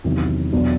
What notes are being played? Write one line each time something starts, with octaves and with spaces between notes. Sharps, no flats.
E2 C3 D#3 F#3
E2 B2 F#3 B3 D4